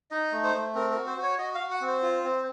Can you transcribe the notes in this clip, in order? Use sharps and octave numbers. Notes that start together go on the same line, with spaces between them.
D#4 D#5
A3
C5
A3
C4 A#4
A#4
F#4
C5
F#4 C#5
F#4 D#5
F5
F#4
F#5
C4
C5
F4
C4